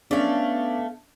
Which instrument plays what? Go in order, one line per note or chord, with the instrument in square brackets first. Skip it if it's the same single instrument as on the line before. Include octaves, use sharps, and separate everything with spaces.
[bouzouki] A3 F5 [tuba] B3 [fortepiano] C#4 D4